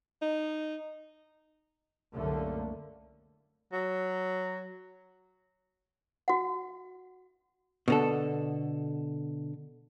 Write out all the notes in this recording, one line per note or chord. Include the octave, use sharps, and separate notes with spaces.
D#4
C2 F#2 D3 A3 A#3
F#3
F#4 F#5
B2 D3 A4